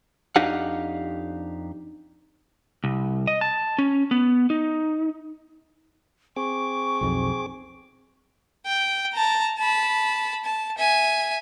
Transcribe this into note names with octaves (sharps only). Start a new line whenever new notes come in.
F2 D4 D#4 G4 F5 F#5
C2
D#5
A5
C#4
B3
D#4
C4 G#4 C#6 D6
B1 F2
G5
A5 A#5
A5 B5
A5
E5 G#5